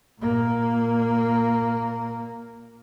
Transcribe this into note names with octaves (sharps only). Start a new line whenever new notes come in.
A#2 A#3